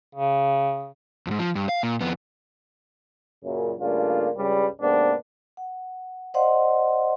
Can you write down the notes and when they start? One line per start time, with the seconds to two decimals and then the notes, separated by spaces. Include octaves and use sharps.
0.15 C#3
1.27 F2 G#2
1.39 F3
1.55 G2
1.69 F5
1.83 A#2
2.01 F2 B3
3.44 F#2 A#2 C#3
3.80 G2 C#3 A3 A#3 D4 F4
4.36 C#2 G2 C#3 G3
4.81 G#2 C3 A#3 B3 D4
5.57 F#5
6.34 C5 D5 D#5 F5 F#5 C6